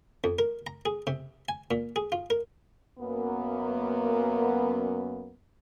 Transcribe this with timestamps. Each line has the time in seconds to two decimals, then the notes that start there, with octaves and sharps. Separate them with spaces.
0.24 F2
0.39 A#4
0.67 A#5
0.86 G#4
1.07 C3
1.49 G#5
1.71 A#2
1.96 G#4
2.12 F4
2.30 A#4
2.99 F#2 A#3 B3